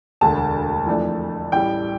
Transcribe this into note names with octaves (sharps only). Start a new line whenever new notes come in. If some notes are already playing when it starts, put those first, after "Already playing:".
E1 D2 D3 A5
F2 E3 A3 D4
A1 A2 G3 G5